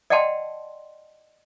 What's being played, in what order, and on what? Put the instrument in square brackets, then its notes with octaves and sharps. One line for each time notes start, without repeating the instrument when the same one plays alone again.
[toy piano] D5 D#5 F#5 G5 A5 C6